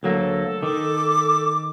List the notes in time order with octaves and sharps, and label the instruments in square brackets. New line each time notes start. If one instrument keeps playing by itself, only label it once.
[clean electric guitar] D2 F#3 A#3 [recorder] A4
[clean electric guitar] D#3 [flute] D6